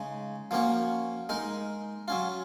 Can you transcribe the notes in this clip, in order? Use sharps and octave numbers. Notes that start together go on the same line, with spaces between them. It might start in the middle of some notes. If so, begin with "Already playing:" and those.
Already playing: C#3 G#3 D#4
F3 A#3 C#4 F#4
G#3 D#4 A#4
F#3 C#4 F4